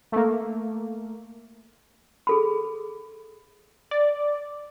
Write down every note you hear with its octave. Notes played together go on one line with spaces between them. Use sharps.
A3 A#3
G#4 A4 B5
D5